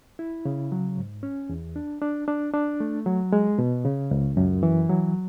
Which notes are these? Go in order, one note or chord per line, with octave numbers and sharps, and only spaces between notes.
E4
C#3
F#3
G#2
C#4
E2
D4
D4
D4
D4
A3
F#3
G#3
B2
C#3
C#2
F#2
E3
F#3